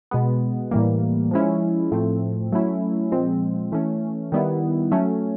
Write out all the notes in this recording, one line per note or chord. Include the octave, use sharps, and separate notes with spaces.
B2 G#3 B3
A2 E3 G3 A#3
F3 G#3 C#4 E4
A2 F3 A3 C4
F#3 A3 C#4 E4
A#2 F3 G#3 C4
E3 A3 C#4
D#3 G3 B3 E4
F#3 A3 C#4